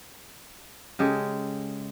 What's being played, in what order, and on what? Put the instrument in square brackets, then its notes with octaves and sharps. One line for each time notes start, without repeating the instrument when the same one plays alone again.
[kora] C#3 G#3 G4 A4